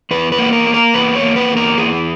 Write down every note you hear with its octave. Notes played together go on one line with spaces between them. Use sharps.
E2 B4
B4
A#3
A#4
A#3
A#4
E2 B4
C#5
A#3
B4
E2
A#4
E2 G#4